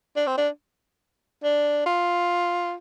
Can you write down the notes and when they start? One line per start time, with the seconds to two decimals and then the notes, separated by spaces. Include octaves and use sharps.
0.16 D4
0.27 C4
0.37 D4
1.44 D4
1.86 F4